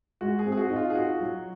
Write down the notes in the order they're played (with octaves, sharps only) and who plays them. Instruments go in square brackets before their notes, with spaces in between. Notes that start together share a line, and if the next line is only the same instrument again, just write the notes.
[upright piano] G#3 [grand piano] F#4
[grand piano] G#4
[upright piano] C4
[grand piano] G#4
F#4
[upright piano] D#4
[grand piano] F4
G#4
[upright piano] F4 [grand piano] F#4
[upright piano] F#3